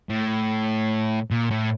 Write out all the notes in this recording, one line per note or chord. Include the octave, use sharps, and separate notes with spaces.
A2
A#2
A2